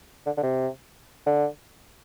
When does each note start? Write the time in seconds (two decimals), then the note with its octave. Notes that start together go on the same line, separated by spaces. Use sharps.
0.26 D3
0.37 D3
0.43 C3
1.26 D3